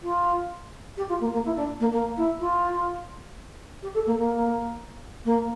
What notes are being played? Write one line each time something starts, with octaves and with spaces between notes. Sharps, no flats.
F4
G4
F4
A#3
A#3
E4
D4
A#3
A#3
E4
F4
G4
A4
A#3
A#3
A#3